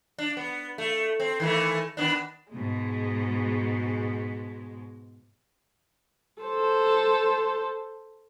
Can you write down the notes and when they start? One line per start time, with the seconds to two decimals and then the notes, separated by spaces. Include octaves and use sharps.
0.18 D4
0.37 B3
0.78 A3
1.20 C4
1.40 D#3 E3 A3
1.97 D#3 B3 D4
2.53 G#2 B2 G#3
6.43 A4 C5